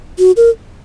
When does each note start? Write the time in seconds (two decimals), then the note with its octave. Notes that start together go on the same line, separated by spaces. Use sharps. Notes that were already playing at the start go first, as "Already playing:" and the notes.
0.19 F#4
0.37 A#4